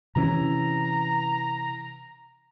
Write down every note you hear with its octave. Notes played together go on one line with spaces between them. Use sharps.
C3 E3 C#4 A#5